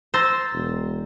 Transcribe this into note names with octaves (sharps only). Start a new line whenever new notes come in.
C5 A#5 E6 A6
E1